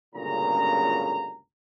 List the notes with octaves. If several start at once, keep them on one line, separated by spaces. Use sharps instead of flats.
G1 C#2 A#2 C#3 F#3 A#5